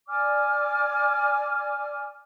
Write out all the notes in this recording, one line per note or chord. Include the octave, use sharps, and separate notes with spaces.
D5 G#5 D6 F6